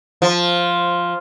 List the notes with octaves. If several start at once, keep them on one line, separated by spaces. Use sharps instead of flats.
F3